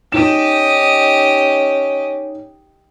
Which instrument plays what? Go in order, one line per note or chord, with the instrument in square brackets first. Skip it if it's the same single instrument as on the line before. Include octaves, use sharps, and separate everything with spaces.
[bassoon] C#4 [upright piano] D#4 E7 [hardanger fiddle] G4 D#5